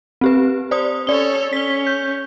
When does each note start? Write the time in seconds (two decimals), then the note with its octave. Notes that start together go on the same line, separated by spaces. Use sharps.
0.21 C4 G4 B4
0.71 C5 D5 D#6
1.07 C#4 A4 C#5 D5 G7
1.53 C#4 B6 G7
1.87 G6